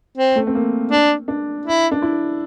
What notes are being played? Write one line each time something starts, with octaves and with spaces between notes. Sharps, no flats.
C4
A3
C4
A#3
D4
D4
E4
D4
E4